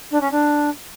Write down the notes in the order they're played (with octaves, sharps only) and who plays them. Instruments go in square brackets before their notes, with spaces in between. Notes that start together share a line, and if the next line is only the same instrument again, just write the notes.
[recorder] D4
C#4
D4